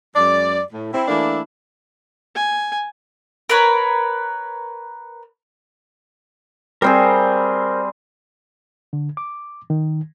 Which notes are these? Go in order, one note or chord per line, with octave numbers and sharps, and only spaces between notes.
F#2 G#3 D5
A2
C4 E4
E3 A3 A#3 D4 E4
G#5
A#4 B4 C#5
G3 C4 G#4 A#4 C5 E6
D3
D6
D#3